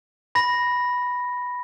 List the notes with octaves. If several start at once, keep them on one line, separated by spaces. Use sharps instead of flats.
B5 A#6